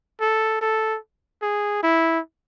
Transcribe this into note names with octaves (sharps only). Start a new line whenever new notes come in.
A4
A4
G#4
E4